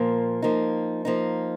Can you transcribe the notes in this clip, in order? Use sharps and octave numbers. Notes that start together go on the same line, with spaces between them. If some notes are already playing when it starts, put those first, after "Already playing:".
Already playing: A#2 F3 A#3
F3 A#3 D#4
F3 A#3 D#4